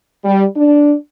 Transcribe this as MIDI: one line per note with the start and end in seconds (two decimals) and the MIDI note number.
0.25 0.43 55
0.55 0.93 62